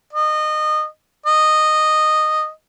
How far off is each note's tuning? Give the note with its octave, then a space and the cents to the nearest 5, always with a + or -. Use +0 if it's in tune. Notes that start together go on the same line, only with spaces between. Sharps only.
D#5 -25
D#5 -10